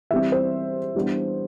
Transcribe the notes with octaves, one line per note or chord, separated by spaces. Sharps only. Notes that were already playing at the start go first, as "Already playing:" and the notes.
E3 G3 C4 E5
C5
E3 G3 B3 D4